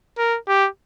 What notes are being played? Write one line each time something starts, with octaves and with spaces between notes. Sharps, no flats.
A#4
G4